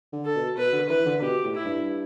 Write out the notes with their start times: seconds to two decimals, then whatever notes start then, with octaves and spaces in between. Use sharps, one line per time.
0.13 D3
0.25 A4
0.36 B2
0.57 B2 B4
0.73 D3
0.89 E3 B4
1.06 D3
1.22 B2 G4
1.44 A2
1.55 E4
1.66 G2